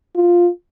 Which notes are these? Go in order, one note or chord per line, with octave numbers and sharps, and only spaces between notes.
F4